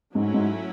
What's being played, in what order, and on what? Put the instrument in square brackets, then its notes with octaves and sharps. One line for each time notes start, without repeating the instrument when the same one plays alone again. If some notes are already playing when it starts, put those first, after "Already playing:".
[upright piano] G#2 [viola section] F#3 A3 C#4 E4
[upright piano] G#2